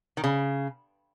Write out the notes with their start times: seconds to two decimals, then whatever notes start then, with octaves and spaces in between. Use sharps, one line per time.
0.17 D#3
0.24 C#3